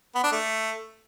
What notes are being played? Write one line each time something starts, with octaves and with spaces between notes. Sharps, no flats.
B3
D4
A3